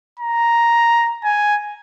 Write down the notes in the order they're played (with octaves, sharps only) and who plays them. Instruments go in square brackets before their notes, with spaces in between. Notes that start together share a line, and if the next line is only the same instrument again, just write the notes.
[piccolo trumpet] A#5
G#5